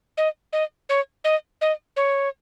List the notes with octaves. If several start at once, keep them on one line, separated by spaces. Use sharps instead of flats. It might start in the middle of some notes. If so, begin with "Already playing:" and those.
D#5
D#5
C#5
D#5
D#5
C#5